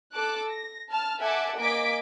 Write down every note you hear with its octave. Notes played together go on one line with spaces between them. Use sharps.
A4 A5 D6 F#6
A#6
A5 F6
A4 E5 F#5 G#5 A5 D6
A#3 D#5 G#5 D6 B6 D7